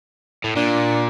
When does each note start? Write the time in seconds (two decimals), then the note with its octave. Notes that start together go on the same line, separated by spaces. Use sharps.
0.44 A2
0.56 A#2 D4